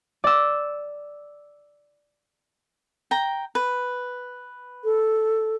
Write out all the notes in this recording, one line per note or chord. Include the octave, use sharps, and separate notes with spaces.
D5 E6
G5 A#5
B4
A4